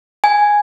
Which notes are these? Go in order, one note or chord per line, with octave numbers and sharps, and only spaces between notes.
G#5